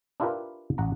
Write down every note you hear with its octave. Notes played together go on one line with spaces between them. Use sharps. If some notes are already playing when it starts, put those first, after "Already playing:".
D4 E4 F4 G4 A#4 B4
A1 F#5 A#5